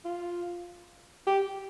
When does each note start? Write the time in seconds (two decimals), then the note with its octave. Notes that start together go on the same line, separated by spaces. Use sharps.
0.05 F4
1.27 G4